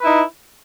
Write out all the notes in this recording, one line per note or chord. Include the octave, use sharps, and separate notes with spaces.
D#4 E4 B4